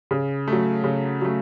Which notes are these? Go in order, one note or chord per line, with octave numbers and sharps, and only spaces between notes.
C#3
F#3 A3
C#3
F#3 A3